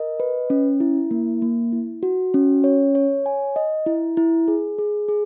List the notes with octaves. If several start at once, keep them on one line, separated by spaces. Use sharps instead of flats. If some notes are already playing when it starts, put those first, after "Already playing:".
Already playing: A#4 D#5
B4
C#4
E4
A#3
A#3
E4
F#4
C#4
C#5
C#5
G#5
D#5
E4
E4
G#4
G#4
G#4